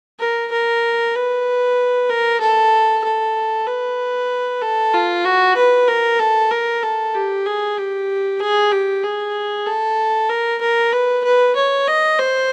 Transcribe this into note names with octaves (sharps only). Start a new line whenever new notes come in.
A#4
A#4
B4
A#4
A4
A4
B4
A4
F4
F#4
B4
A#4
A4
A#4
A4
G4
G#4
G4
G#4
G4
G#4
A4
A#4
A#4
B4
B4
C#5
D#5
C5